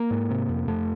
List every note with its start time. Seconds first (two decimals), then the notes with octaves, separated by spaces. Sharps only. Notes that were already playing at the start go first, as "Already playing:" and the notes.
Already playing: A#3
0.11 G#2
0.31 C3
0.49 F2
0.68 F2 A3